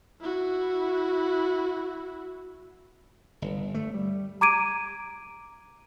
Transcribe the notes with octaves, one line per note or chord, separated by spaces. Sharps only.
E4 F#4
G1
A3
G3
A#5 D6 G#6 D7 D#7